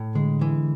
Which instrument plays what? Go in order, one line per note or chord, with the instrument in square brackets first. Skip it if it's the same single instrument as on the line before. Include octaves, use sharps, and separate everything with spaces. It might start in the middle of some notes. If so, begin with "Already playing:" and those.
Already playing: [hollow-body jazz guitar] A2
[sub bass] D3 [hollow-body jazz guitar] G#3
[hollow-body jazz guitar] E3